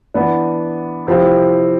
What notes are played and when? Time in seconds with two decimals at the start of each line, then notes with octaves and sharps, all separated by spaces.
0.14 E3 B3 D4
1.07 C3 F3 C4 E4 G4